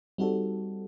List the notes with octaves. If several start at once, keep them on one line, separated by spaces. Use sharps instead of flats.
G3 C4 D#4 F#4 A4